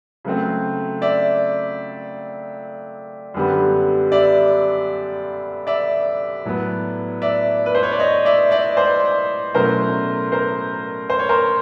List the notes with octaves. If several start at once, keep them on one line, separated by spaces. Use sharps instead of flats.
C#3 F#3 A3 C4
D5 E5
F#2 D3 G3 B3
D5 E5
D5 E5
A2 F#3 B3
D5 E5
B4
C5
C#5
D5
C#5 D#5
D5 E5
D5 E5
C5 D5
B2 F#3 A3 C#4 E4 A#4 C5
A#4 C5
C5
C#5
A#4 C5